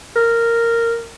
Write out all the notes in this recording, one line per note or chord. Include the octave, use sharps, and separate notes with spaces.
A#4